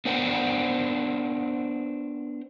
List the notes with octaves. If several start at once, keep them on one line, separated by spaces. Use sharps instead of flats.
B3 D4 A#4 C5 F#5 G5